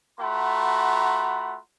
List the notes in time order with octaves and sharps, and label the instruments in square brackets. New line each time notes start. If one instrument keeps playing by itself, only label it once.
[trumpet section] A3 F4 F#4 F#5 A#5 B5